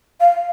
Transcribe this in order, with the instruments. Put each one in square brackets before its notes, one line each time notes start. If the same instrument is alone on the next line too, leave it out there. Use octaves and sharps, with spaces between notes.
[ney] F5